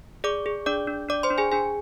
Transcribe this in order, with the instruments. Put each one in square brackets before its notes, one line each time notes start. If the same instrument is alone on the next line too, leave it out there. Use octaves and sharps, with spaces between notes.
[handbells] G#4 D5 D6
G#4
D4 D5 D6
D4
D4 D5 D6
C5 C6
D4
G#4 G#5
D4 G#4 G#5